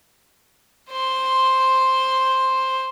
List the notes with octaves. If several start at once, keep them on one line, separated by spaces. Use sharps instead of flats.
C5 C6